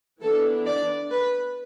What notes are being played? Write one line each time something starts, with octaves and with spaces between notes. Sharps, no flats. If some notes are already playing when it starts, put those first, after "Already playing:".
E3 B3 D4 A4
D5
B4